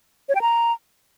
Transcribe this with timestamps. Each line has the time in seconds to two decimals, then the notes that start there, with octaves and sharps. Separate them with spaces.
0.29 C#5
0.35 G5
0.41 A#5